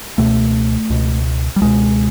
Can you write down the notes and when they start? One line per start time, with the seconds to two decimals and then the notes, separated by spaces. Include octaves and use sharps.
0.18 C#2 B2 A3
0.90 C#2 B2
1.56 G3
1.61 C#2 B2 G#3